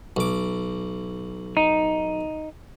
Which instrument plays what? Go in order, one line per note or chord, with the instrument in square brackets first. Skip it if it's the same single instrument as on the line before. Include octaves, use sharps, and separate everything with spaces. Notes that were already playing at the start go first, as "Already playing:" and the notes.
[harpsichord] B1 D6
[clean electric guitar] D#4